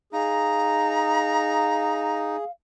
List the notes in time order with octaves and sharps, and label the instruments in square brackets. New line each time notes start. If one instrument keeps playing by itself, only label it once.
[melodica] D#4 [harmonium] G#4 [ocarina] F5 [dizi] A#5